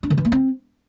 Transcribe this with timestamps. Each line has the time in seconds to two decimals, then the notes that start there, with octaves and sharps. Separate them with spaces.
0.03 D4
0.10 D#3
0.17 E3
0.25 A#3
0.32 C4